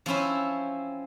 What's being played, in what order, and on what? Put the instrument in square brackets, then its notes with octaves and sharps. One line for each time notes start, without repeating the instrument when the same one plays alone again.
[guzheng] F3 C4 C#4 E4